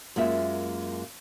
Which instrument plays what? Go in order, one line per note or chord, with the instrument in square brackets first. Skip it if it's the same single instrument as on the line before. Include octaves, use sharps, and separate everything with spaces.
[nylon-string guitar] F#2 G#3 A#3 F4 E5